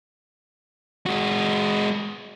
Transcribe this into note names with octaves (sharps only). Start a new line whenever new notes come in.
G#3 F#4